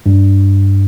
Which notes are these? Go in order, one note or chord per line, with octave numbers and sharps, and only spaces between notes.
G2